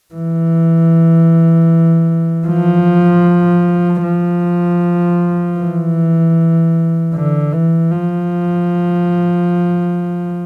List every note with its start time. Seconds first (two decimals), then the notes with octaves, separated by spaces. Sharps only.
0.14 E3
2.47 F3
4.03 F3
5.58 E3
7.14 D3
7.53 E3
7.91 F3